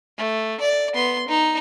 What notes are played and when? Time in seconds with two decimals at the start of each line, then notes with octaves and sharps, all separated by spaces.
0.18 A3
0.61 D5
0.94 B3 C6
1.28 D#4